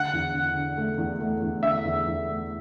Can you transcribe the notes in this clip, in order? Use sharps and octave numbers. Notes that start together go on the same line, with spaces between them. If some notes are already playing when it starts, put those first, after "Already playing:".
Already playing: D3 F#5
E2
D3
D3
A3
E2
A3
E2
D3 E5
E2
E2
A3